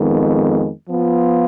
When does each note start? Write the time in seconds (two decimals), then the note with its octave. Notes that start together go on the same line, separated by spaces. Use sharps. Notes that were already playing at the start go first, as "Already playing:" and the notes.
Already playing: F2 D#3 G#3 B3
0.90 F3 B3 F4